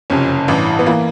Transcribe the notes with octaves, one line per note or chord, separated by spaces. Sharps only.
F#1 F2 C3 C#4
A1 G2 E3
B3
E3 A#3